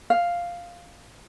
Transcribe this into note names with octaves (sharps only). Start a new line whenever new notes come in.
F5